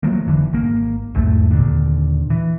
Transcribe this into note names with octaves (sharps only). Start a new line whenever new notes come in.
F3 F#3 A3 A#3
F1 D3 E3
G#1 A#3
B1 E2 G#2 A3
D#2 A#2 D3
E3